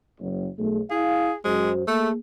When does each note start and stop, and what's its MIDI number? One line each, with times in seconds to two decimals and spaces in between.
0.20 0.48 30
0.58 0.80 35
0.58 0.80 57
0.58 0.80 68
0.90 1.30 64
0.90 1.36 68
0.90 1.30 77
1.45 1.85 42
1.45 1.71 56
1.45 1.85 66
1.45 1.85 72
1.88 2.10 57
1.88 2.15 58
1.88 2.15 68